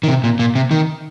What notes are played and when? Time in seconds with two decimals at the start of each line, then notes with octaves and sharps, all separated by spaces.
0.03 D#3
0.08 C3
0.24 A#2
0.39 A#2
0.55 C3
0.71 D#3